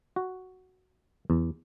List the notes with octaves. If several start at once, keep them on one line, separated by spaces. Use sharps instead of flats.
F#4
E2